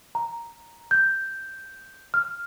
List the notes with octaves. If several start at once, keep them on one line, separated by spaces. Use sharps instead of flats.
A#5
G6
F6